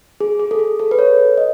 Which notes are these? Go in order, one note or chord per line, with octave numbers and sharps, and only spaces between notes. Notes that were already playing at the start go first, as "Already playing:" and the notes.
G#4
G#4
A4
G#4
A4
B4
C#5
D#5